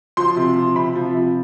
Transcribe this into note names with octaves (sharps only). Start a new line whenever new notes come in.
F3 C6
C3
F3
C3 B5
F3
C3